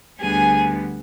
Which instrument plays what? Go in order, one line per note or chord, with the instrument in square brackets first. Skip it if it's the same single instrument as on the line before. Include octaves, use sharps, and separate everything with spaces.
[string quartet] D2 D3 G3 B3 G#4 G#5